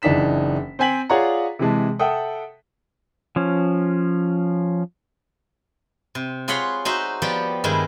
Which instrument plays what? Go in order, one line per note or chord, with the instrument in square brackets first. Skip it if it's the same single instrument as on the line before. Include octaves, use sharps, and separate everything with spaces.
[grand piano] F#1 E3 D4 D#4 B6 E7
C4 C5 G5 G#5 B6 F#7
F4 G#4 C#5 D5 F#5 A#5
C3 E3 G#3 A5
A4 E5 F#5 G5 D#6
[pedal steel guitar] F3 C#4
[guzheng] C3
F4 G#4 C#5 F#5 B5 C6
D#4 F#4 C5 E5
F3 B3 G4 B4 D5
G2 D#3 G#3 E4